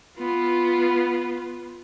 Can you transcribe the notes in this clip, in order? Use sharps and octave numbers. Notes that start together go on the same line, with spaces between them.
B3 F4